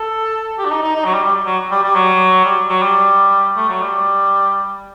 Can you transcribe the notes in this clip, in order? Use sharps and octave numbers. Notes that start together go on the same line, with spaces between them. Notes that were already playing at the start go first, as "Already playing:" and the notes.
Already playing: A4
G4
D4
D#4
D#4
D#4
F#3
G3
G3
F#3
G3
G3
F#3
G3
F#3
G3
A3
F#3
G3